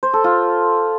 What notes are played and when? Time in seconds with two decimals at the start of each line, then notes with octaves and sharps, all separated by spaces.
0.03 C5
0.13 A4
0.24 F4